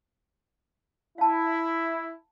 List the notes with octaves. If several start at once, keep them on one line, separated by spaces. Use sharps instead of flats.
E4 F5 A5